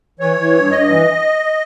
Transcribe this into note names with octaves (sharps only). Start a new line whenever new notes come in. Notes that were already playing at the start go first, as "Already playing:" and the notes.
E3 C#5
E3
G2
G2 D#5
E3